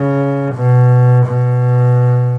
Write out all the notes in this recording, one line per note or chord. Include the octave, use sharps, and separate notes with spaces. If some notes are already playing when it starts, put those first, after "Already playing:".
Already playing: C#3
B2
B2